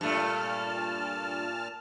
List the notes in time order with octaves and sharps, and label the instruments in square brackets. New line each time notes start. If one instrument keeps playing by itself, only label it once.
[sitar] G2 A3 [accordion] A#2 A5 F6